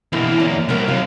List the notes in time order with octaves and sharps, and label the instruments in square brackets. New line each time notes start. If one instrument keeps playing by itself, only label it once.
[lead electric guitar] E2 A#3 [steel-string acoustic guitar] B2 D3 E3
[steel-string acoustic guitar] F#2 D3 A#5
[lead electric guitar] C2 [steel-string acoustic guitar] B3 A#4 G5
[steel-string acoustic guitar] D#2 F5 [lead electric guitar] C3 F#3